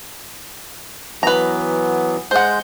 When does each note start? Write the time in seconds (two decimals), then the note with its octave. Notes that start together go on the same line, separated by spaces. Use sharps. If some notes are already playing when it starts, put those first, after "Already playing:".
1.23 E3 F#3 B3 B4 A#5
2.31 G#3 C5 F#5 G6